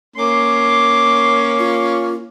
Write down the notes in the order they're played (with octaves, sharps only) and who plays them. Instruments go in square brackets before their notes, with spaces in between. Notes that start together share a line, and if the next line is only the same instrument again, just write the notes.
[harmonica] A#3 C#4 [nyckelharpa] C6 D6
[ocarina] F4